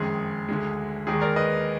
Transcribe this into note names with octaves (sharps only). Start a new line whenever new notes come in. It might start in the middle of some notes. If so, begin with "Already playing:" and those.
Already playing: F#1 F2 D#3 G#3 G#4
D2 D3 G#3
D#2 D#3 G#3 G#4
A#4 D5
B4 D#5